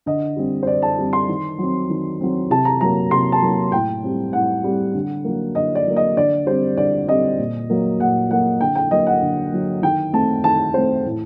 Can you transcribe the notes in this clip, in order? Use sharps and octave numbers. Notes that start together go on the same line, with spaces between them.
D3 D#5
G3 C4
C5
D3 D5
A5
G3 C4
C6
D#3
F#3 C4
D#3
F#3 C4
C3 A5
A#5
F#3 A#3 A#5
C3 C6
A5
F#3 A#3
A2 G5
G3 C4
A2 F#5
G3 C4
D3
F#3 A#3
D3 D#5
D5
F#3 A#3
D#5
D3 D5
G3 C4 C5
D3 D5
G3 C4 D#5
A#2
F#3 A#3
A#2 F#5
F#3 A#3 F#5
D3 G5
G5
F#3 A#3 D#5
F#5
D3
F#3 A#3
D#3 G5
A3 C4 A5
D#3 A5
A3 C4 C5
A2